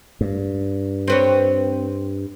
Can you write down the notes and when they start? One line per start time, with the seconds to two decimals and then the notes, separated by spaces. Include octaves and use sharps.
0.21 G2
1.08 C4 B4 C#5